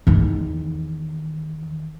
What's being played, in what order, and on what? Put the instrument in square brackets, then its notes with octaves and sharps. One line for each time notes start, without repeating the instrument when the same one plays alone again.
[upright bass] E2 D#3